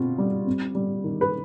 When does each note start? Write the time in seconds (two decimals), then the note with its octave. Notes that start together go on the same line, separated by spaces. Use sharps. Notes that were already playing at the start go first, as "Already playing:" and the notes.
Already playing: B2 C4 F4
0.18 G3
0.47 C4
0.75 G3
1.04 D#3
1.21 B4